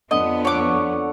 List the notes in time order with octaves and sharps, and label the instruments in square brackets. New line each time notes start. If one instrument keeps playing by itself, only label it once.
[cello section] F2 B3 [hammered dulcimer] D3 [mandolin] D#5
[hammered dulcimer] A4 D5 F#5 [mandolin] C#5 D6